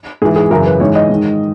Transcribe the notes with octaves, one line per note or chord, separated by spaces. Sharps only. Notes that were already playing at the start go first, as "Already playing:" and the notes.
G#2 E3 G#4
G#4
F#2 C#3 E3 A#4
B4
G#2 E3 C#5
D#5
G#2 D#3